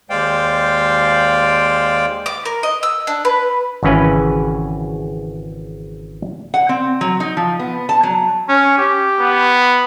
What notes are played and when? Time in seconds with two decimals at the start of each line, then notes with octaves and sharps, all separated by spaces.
0.10 D#2 G#3 C5 D5 F5 G5
2.26 D6
2.45 A#4
2.63 D#5
2.83 E6
3.07 D4
3.25 B4
3.83 G#1 C#3 E3 C#4 B4
6.54 F#5
6.69 C4
7.01 F#3
7.20 D#4
7.37 F3
7.59 B3
7.89 A5
8.03 F#3
8.49 C#4
8.78 G4
9.20 B3